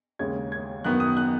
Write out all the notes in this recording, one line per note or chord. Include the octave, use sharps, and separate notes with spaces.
D#2 C#3 G#3 C#4 G#6
G#6
F#2 D#3 B3 F#6
D#6
F#6